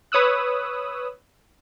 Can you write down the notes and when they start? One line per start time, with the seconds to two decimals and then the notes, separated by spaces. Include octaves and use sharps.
0.12 B4 C#5 D#6 E6 F#6